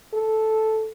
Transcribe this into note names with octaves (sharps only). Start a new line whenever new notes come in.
A4